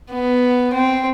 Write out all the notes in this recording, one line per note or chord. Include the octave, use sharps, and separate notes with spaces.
B3
C4